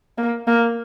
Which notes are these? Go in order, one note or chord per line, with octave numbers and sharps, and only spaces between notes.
A#3
A#3